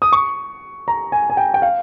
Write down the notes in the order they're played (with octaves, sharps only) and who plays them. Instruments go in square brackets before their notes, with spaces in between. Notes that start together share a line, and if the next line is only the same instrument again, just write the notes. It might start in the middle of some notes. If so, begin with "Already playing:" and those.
[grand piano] D#6
C#6
A#5
G#5
G#5
G5
G5
F5